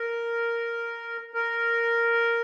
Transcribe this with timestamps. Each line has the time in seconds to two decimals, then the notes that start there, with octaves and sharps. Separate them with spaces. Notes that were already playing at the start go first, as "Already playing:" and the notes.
Already playing: A#4
1.34 A#4